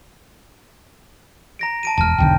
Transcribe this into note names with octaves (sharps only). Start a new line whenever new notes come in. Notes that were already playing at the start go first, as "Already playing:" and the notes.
A#5 A#6 D7
A5 D7 D#7
E1 A5 F6
E1 B1 D3 G5